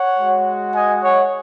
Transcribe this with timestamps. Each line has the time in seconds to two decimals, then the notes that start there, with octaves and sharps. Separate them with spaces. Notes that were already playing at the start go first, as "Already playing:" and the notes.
Already playing: C#5 F#5
0.17 G#3 F#4
0.73 D#5 G#5
1.01 C#5 F#5